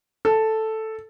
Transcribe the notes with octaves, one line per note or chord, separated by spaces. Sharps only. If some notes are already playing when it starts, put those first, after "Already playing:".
A4